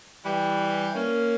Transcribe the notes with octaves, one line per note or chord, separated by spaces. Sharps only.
E3 G3
A#3 C#4